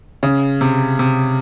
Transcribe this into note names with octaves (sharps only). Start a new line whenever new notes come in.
C#3
C3
C3